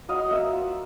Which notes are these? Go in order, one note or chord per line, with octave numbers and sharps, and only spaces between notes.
F#3 D#5 F5
A#3 E5 F#5
F4